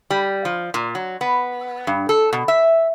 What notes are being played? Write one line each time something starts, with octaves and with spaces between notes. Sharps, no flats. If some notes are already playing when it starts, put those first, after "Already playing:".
G3
F3
A#2
F#3
B3
G2
A4
B2
E5